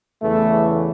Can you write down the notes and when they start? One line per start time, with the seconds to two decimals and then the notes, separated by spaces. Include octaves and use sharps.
0.21 E2 C#3 E3 A3